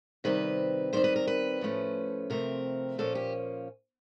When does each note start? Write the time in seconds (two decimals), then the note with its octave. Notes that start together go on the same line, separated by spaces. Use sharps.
0.24 C3 D#3 G3 C4 B4
0.93 D#3 G3 C4 C5
1.04 B4
1.16 A#4
1.27 B4
1.61 A2 F3 A3 C#4
2.30 C3 F3 A3 C4 A#4
2.98 A#2 F3 A#3 C#4 A4
3.15 G4